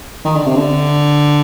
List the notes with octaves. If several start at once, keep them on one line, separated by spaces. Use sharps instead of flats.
D#3
D3
C3
D3